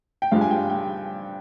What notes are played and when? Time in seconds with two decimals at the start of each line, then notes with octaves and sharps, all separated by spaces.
0.22 G5
0.32 G2 F3 G#3 F5
0.41 G#5
0.51 G5
0.70 G5